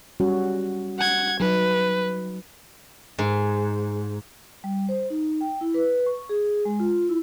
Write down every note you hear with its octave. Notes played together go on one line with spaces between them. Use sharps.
G3 C#4 F#4
F#5 G#6
F#3 D#4 B4
G#2
G3
C5
D#4
G5
E4
B4
C#6
G#4
G#3
F4
E4